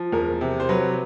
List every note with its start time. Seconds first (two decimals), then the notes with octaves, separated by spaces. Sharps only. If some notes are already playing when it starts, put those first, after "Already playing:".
Already playing: F3
0.12 E2 A#4
0.41 C3
0.60 C5
0.69 F#3 B4